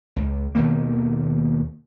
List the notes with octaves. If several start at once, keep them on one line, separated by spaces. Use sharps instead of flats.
C#2
D#2 B2 D#3 A#3